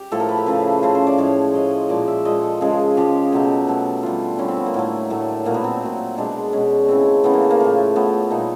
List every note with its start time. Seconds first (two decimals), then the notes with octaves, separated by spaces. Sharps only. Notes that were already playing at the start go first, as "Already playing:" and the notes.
Already playing: G4
0.12 A2 F3 A3 A4
0.20 A#4
0.29 B4
0.38 A4
0.46 C#3 F3 A3 B4
0.83 C#3 F3 A3 C5
0.95 C5
1.07 D5
1.18 A2 F3 G#3 C#5
1.54 A2 F3 G#3 D#5
1.89 A#2 F3 G#3 D5
2.08 E5
2.25 A#2 F3 G#3 D#5
2.43 A4
2.61 C#3 F3 G#3 G#4
2.97 C#3 F3 G#3 G4
3.32 B2 F#3 A3 G4
3.67 B2 F#3 A3
4.03 D3 G3 F4
4.38 D3 G3 C#4
4.48 C4
4.57 B3
4.66 A#3
4.74 A2 F#3 A3
5.10 A2 F#3 A3
5.45 A#2 F#3 A3 A#3
5.54 B3
5.64 C4
5.82 A#2 F#3 A3
6.17 B2 G#3 D4
6.53 B2 G#3 C#4
6.88 C#3 E3 A3 C4
7.24 C#3 E3 A3 B3
7.33 A#3
7.42 A3
7.51 A#3
7.60 A2 F3 A3
7.96 A2 F3 A3 B3
8.31 A#2 G3 D#4